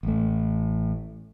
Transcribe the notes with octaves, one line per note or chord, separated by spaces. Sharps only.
A1 A3